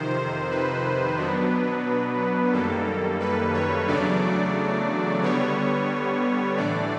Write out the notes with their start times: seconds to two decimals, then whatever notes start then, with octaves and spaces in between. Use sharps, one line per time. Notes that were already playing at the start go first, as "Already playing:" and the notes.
Already playing: F2 C3 D#3 C5
0.51 B4
1.17 B2 F#3 B3 D4
2.53 F#2 D#3 G3 A#3 A4
3.20 B4
3.54 C#5
3.88 E2 C#3 F#3 A3 D4 D5
5.22 D3 G3 B3 C#5
6.57 A2 E3 A3 D4 D5